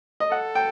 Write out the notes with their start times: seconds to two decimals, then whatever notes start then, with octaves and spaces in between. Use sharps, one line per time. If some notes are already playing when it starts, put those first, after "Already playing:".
0.20 D#5
0.31 A4 F#5
0.55 G5